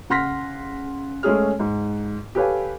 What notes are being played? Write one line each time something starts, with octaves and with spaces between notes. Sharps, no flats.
C#3 F#5 C6 F6 A#6 B6
G#3 A3 C#4 G#4 F6
G#2
G4 A4 B4 C#5 F5 G#5